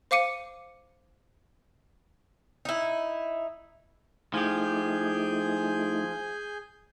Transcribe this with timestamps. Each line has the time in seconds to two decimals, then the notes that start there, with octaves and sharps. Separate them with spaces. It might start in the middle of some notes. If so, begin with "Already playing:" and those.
0.11 C5 F5 D6 C#7 D#7
2.65 D#4 E4
4.34 F3 A3 D#4 E4 G4 G#4 G#5 G6